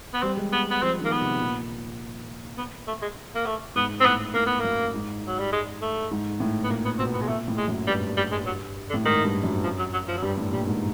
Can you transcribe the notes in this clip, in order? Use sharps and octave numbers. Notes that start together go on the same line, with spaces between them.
B3
G3 C4
G#3
B3
B3
F3 C4
D#3 A#3
B3
C3
A#2
B3
A3
G#3
A#3
A3
G#2 B3
C4
A2 B3
A2 A#3
B3
F#2 A#3
G#2
F#3
G3
G#3
A3
G#2
A2
B3
A#2 A#3
B3
B2 C4
B3
G#3
A#2 A3
A2
G#3
F#2
G2 G3
G3
G#3
F#3
D3
A2
G#2 D#3
G2
F#2
F3
F#3
F#3
F3
F#3
G2 G3
A2
A#2 G3
G#2